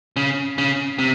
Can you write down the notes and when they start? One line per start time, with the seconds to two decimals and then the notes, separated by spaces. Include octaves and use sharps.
0.16 C#3
0.58 C#3
0.99 C3